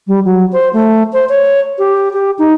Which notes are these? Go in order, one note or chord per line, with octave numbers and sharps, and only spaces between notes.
G3
F#3
C5
A3
C5
C#5
G4
G4
D#4